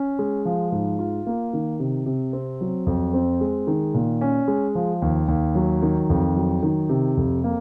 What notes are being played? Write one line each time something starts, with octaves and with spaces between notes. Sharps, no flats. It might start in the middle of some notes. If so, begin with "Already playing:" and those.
Already playing: C#4
G#3
F3
G#2
F4
A#3
D#3
C3
C3
C4
F#3
F2
C4
G#3
D#3
A#2
C#4
G#3
F3
D#2
D#2
F#3
D#3
F2
F#3
D#3
C3
F2
A#3